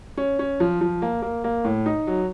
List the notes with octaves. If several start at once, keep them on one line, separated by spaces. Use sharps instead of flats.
C#4
C#4
F3
F3
A#3
A#3
A#3
A2
D#4
F#3